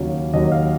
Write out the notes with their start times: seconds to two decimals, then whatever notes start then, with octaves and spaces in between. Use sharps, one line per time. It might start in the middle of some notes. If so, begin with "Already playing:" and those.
Already playing: D#2 C#3 F#3
0.33 D#2 C#3 F#3 D#5
0.52 F5